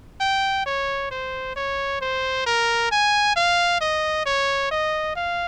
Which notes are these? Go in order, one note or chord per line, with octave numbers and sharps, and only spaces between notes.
G5
C#5
C5
C#5
C5
A#4
G#5
F5
D#5
C#5
D#5
F5